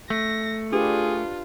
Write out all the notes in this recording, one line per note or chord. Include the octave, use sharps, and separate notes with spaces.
A3 A#6
D4 F4 G4 G#4 B4